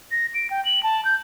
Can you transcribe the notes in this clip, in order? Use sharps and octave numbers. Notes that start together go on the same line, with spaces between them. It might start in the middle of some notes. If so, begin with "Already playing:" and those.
A#6
D7
G5
F#7
A5
G6